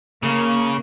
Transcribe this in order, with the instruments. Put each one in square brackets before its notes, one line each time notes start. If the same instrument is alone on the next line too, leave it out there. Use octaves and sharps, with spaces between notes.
[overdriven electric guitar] C#3 [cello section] A#3